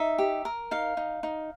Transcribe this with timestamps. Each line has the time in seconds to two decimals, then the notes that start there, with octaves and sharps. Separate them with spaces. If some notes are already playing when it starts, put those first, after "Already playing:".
Already playing: D#4 E5
0.18 G4
0.45 A#4
0.71 D#4 F5
0.97 D#4
1.23 D#4